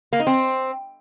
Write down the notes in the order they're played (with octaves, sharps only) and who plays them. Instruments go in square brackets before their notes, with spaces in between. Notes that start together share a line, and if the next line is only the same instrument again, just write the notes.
[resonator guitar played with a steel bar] A#3
D#4
C4